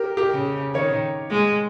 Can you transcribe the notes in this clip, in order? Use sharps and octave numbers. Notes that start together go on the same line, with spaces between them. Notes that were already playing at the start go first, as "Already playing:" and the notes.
Already playing: G4 A#4
G4 A#4
C#3
D#3 A#4 C#5
G#3